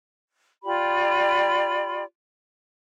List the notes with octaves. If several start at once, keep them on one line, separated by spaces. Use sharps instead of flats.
F4 G4 D5 B5